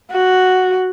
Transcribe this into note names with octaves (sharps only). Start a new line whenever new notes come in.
F#4